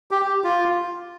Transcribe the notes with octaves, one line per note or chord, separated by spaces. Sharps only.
G4
F4